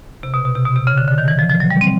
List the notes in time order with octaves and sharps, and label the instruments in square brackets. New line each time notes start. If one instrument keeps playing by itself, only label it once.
[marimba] C3
B2
B2
C3
B2
C3
C#3
D3
D3
D#3
E3
F3
F3
F#3
G3
C4